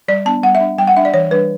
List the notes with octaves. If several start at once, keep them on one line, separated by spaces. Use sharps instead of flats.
G3 D5
B3 D4 A5
G3 F#5
E5
D4
G3 G5
F#5
D4 E5
D5
E3 C#5
G3 D4 B4